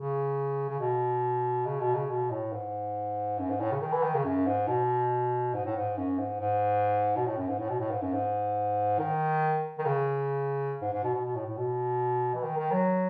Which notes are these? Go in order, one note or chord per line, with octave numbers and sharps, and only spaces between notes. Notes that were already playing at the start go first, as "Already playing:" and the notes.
Already playing: C#3
C#3
B2
C#3
B2
C#3
B2
A2
G#2
F#2
G#2
A2
C#3
D#3
E3
D#3
C#3
F#2
G#2
B2
G#2
A2
G#2
F#2
G#2
G#2
B2
A2
F#2
G#2
A2
B2
A2
G#2
F#2
G#2
D#3
D#3
C#3
G#2
G#2
B2
B2
B2
A2
A2
B2
E3
D#3
D#3
F#3